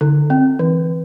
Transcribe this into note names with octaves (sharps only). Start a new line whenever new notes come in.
D3
C4
E3